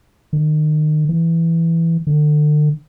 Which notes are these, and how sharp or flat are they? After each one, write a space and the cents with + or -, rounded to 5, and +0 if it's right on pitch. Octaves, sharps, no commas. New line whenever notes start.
D#3 -30
E3 +5
D3 +35